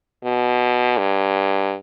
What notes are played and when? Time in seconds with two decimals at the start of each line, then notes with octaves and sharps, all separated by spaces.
0.24 B2
0.98 G2